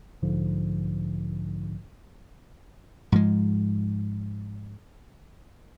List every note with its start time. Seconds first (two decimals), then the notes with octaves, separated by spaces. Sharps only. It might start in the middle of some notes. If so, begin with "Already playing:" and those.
0.22 B1 G#2 D3 F3
3.12 G#2 F3 G#3